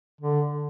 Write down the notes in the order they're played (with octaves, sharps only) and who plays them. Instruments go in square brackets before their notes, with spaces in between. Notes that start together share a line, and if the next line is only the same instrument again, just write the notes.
[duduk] D3